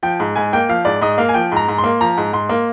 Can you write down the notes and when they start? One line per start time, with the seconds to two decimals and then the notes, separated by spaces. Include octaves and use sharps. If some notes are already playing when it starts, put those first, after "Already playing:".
0.03 F3 G5
0.20 G#2
0.36 G#2 G#5
0.53 A#3 G5
0.69 F3 F5
0.85 G#2 D5
1.01 G#2 D#5
1.18 A#3 F5
1.29 G#5
1.34 F3 G5
1.52 G#2 A#5
1.68 G#2
1.78 C6
1.84 A#3
2.01 F3 A#5
2.17 G#2
2.33 G#2 C6
2.49 A#3